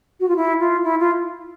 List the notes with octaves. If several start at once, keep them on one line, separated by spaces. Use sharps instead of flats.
F#4
F4
E4
F4
E4
F4